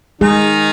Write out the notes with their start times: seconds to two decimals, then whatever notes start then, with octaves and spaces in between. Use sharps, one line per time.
0.21 D#3 G#3 D#4 G#4